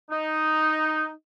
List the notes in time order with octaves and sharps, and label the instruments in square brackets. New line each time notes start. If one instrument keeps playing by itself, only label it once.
[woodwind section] D#4